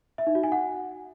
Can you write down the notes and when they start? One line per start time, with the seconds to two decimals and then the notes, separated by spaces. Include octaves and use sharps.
0.18 E5
0.27 D#4
0.35 F#4
0.43 G#5
0.52 F#5